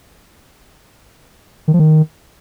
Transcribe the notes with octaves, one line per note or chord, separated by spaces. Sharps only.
D#3
F3
D#3